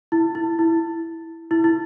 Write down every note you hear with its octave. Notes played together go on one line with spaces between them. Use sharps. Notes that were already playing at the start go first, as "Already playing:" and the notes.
E4
E4
E4
E4
E4